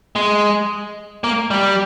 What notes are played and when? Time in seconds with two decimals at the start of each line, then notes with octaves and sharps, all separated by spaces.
0.16 G#3
1.24 A#3
1.51 G3